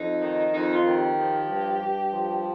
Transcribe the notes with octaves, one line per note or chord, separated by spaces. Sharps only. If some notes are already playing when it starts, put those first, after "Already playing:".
Already playing: F2 D#4
D#3
F2 D#4
F4
D#3
G4
F3
G2
G2
F3